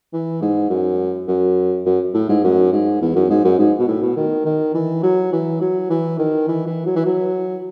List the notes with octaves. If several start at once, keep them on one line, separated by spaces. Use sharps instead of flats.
E3
G#2
F#2
F#2
F#2
A2
G#2
F#2
G#2
E2
F#2
G#2
F#2
G#2
B2
A2
B2
D#3
D#3
E3
F#3
E3
F#3
E3
D#3
E3
E3
F#3
E3
F#3